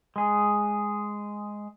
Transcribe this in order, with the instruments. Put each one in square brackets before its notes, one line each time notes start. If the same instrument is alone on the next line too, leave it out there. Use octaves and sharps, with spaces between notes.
[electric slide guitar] G#3 G#4